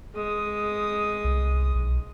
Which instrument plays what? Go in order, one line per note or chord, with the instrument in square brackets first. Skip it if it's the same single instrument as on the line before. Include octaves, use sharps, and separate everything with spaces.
[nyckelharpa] G#3 D#6
[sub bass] C2
B1